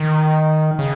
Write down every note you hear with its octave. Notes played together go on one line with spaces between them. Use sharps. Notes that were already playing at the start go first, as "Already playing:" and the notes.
Already playing: D#3
C#3